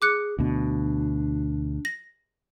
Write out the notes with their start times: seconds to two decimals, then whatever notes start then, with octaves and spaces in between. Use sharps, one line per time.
0.02 G#4 D6 F#6 C#7
0.39 D2 B2 D4
1.85 A#6